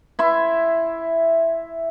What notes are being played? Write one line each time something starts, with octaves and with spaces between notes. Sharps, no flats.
E4 E5 C6